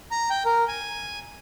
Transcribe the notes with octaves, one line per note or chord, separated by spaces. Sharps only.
A#5
G5
A#4
G#5